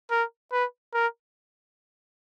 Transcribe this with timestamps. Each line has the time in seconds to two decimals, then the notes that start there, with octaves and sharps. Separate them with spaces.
0.11 A#4
0.52 B4
0.94 A#4